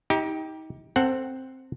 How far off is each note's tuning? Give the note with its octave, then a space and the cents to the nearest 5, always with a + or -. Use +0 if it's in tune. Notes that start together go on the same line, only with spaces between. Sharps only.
D#4 +30 G4 +0
C4 +0 A4 +20 F#5 +0